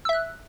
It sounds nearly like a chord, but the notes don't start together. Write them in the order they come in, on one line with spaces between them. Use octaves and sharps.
E6 E5 F#6